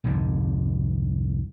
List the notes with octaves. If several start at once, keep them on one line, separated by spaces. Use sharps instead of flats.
C2 F2 G#2 D3